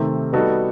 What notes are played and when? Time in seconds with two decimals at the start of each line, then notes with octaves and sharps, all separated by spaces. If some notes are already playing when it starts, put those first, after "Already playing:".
Already playing: C3 D#3 A3 C4
0.33 G3 B3 D#4 F#4 A4